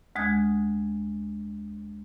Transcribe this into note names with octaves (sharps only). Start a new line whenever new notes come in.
D2 G#3 D#6 F#6 G#6